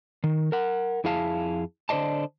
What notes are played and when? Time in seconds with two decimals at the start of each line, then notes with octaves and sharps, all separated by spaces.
0.24 D#3
0.52 A#4 F#5
1.04 F2 E4 G#4 F5 A5
1.89 D3 C5 D5 D#5 A5